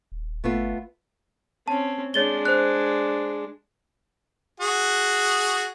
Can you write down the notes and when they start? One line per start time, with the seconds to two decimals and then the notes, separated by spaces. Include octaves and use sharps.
0.12 D#1
0.44 G1 A3 B3 F4
1.68 C4 C#4 A5
2.14 G#3 D4 C#5 A6 G7
2.45 C5 F#6
4.60 F#4 G#4